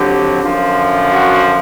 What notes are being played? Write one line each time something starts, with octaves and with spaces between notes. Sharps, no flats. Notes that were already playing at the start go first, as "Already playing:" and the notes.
Already playing: F2 D3 F#3 G4
F#2 D3 F3
F#4